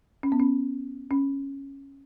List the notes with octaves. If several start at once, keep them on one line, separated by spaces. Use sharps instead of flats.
C#4
B3
C#4
C#4